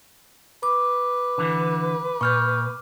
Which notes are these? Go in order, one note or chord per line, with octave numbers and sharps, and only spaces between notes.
B4 D6
D3 E3
A#2 C#6 F6 G6